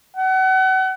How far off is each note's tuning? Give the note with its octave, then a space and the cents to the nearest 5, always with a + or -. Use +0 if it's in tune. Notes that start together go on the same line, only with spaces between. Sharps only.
F#5 +35